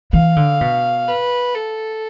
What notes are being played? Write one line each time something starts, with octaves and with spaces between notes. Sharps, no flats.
E3 F5
D3
B2
B4
A4